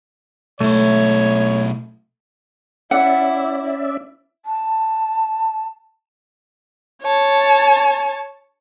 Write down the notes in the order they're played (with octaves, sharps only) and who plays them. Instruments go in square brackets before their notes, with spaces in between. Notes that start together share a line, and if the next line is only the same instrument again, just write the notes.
[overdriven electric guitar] B1 E4 [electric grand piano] A3 [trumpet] C#5
[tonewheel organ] C#4 D5 E5 [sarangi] E4 [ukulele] F#5
[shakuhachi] A5
[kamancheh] C#5 A5